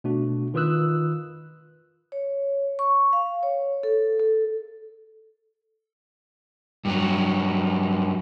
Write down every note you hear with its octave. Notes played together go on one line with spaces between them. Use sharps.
B2 A3 D4 F#4
D#3 F4 B4 D#6 E6 F#6
C#5
C#6
F5
C#5
A4
A4
G2 F#3